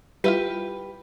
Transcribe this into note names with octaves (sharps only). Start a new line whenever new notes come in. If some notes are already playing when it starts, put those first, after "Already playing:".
G3 E4 F4 G4 B4